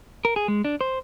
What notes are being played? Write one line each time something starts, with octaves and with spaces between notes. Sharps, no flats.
A#4
G#4
G#3
D4
C5